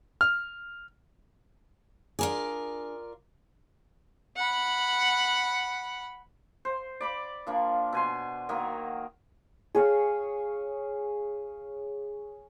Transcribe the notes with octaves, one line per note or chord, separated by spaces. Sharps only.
F6
D4 F4 G#4 A#4 D5
F#5 B5
C5
D5 B5 D6
F3 A#3 D4
B2 G#5 C6
D#3 F#3 A#3 D#5
G#4 C#5 F5